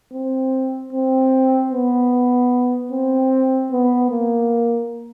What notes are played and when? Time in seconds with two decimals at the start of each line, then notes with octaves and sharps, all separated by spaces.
0.14 C4
0.93 C4
1.72 B3
2.92 C4
3.72 B3
4.11 A#3